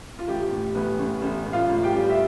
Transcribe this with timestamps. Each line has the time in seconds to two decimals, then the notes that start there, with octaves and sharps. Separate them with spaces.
0.19 F4
0.28 A1 G4
0.51 A2
0.75 A1 B3 B4
0.98 A1
1.22 A1
1.46 A1
1.53 F4 F5
1.69 A1
1.84 G4 G5
1.92 G3
2.10 E5